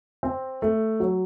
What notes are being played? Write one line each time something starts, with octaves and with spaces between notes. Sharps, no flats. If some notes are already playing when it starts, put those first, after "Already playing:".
C4
A3
F#3